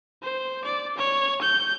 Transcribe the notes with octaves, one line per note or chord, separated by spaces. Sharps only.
C5
D5
C#5
G6